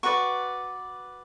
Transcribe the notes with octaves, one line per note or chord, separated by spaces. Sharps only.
F#4 B4 D5 C#6